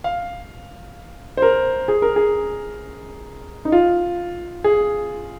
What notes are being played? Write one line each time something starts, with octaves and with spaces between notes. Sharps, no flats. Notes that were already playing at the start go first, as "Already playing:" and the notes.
F5
C5
A#4
G#4
A#4
G#4
D#4
F4
G#4